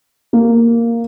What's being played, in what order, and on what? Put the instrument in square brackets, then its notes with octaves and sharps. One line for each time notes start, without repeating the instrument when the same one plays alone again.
[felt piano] A#3